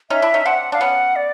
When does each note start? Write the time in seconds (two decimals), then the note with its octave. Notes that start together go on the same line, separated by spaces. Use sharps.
0.10 C#4 D#4 E5
0.22 D4 E4
0.34 C#4 D#4
0.46 C4 D4 F#5
0.72 D4 F5
0.81 B3 C#4 F#5
1.16 D5